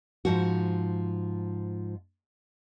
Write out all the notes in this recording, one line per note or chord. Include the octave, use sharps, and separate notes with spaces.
G#2 F3 F#4